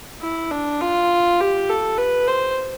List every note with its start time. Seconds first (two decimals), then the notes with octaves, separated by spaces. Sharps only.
0.22 E4
0.51 D4
0.81 F4
1.40 G4
1.70 A4
1.98 B4
2.28 C5